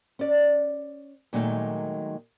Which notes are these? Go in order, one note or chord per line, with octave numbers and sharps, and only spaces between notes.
C#4 D5
A#2 D#3 F#3 G#3 A3 D#4